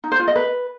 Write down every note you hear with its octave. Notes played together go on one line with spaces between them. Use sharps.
D#4
C5
F4
D#5
B4